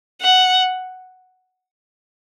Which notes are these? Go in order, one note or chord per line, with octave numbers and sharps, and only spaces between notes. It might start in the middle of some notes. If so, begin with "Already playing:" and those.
F#5